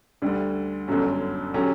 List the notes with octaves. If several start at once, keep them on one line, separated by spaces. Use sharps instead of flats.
D2 D3 G3
G1 F#2 D3 F#3 C#4
D3 F#3 C#4 G4